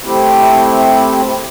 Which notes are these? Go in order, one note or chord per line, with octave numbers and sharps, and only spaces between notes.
A3 C4 E4 G4